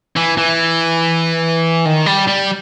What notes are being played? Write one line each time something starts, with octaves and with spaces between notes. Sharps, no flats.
E3
E3
D#3
G3
G3